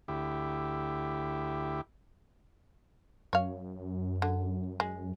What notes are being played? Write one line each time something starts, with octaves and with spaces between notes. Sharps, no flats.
D2 E4 G4
F#2 C#5 F5
D3
G#3